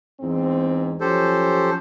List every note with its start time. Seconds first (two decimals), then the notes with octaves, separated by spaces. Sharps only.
0.20 E2 G#2 C4
1.01 F3 F#3 C#4 G4 A4 C5